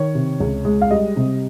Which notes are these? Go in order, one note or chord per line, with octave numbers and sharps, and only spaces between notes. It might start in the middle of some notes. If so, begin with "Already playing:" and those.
Already playing: D#3 C#5
C3
C#2
G#3
F5
G3 D#5
C3